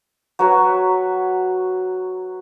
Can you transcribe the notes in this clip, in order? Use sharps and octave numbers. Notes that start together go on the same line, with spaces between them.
F#3 B4 C#5